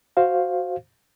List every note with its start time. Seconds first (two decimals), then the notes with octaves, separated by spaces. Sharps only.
0.17 F#4 C5 F5